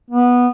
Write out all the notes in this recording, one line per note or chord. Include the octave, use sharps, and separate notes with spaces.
B3